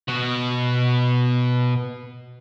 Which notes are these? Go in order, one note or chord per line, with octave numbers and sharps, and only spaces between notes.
B2 F#4